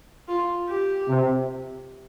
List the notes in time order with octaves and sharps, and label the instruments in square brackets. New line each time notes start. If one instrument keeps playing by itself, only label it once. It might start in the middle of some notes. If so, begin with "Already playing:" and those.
[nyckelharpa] F4
G4
[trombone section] C3